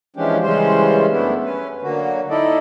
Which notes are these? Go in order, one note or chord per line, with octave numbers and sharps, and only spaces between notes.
E3 F3 G#3 C#4 D4 G4
C#3 E3 G3 G#3 C#4 C5
F#2 A3 B3 D4 E4
C#4 B4
D3 F#3 A#3 F#4
D#4 E4 A4 D5 D#5